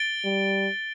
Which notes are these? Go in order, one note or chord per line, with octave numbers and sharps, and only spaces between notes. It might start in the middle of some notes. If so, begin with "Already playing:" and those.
Already playing: A6 D7 G7
G3